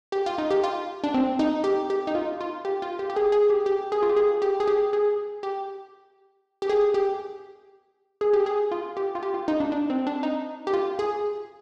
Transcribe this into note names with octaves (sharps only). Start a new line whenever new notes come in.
G4
F4
D#4
G4
F4
D4
C4
D#4
G4
G4
D#4
F4
F4
G4
F4
G4
G4
G#4
G#4
G4
G4
G#4
F4
G4
G#4
G4
G#4
G4
G#4
G4
G4
G#4
G4
G#4
G4
G#4
F4
G4
F4
G4
F4
D#4
D4
D4
C4
D4
D#4
G4
F4
G#4